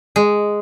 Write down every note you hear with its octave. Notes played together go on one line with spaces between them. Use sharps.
G#3